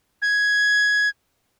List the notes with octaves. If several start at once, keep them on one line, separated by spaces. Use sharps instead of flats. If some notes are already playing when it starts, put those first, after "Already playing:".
G#6